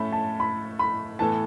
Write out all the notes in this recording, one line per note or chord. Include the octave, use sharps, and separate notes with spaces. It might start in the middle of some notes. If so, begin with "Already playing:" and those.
Already playing: A2 A3 C#4 A4 B5
A5
B5
B5
A2 E3 B3 A4 A5